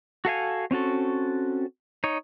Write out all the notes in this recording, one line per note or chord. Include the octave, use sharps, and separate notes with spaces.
F#4 A4 F5 G#5
C4 C#4 F#4 A4
D#4 C#5